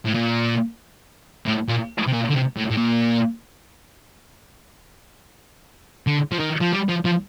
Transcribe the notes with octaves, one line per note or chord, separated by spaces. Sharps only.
A2
A#2
A2
A#2
C3
A#2
D3
C3
A2
A2
A#2
D3
F3
D#3
F3
G3
F3
F3